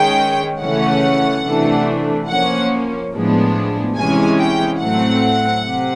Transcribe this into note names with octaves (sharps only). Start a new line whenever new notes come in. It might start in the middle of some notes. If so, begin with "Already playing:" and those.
Already playing: D#3 G#3 C#4 G5
C#3 E3 A3 C#4 F#5
C3 E3 A3 D4
F3 A#3 C#4 F#5
A2 F3 G#3 B3 D4
C3 E3 G#3 C#4 G#5
G5
A2 F#3 A3 C4 F#5
C3